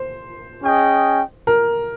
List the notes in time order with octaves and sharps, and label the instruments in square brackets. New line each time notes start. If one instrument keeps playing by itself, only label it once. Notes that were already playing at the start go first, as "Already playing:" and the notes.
Already playing: [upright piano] C5
[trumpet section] C#4 G#4 D#5 G5
[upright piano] A#4